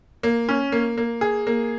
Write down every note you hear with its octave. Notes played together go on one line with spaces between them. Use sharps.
A#3
C#4
A#3
A#3
G#4
A#3